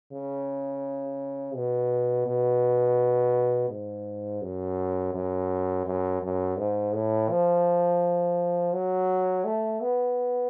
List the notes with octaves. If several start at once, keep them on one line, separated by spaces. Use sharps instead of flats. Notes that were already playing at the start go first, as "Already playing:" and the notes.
C#3
B2
B2
G#2
F#2
F#2
F#2
F#2
G#2
A2
F3
F#3
A3
B3